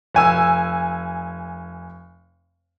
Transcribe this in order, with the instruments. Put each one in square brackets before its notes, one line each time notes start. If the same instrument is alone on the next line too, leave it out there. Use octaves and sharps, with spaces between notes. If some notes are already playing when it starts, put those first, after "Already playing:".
[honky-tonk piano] F1 G#5 E6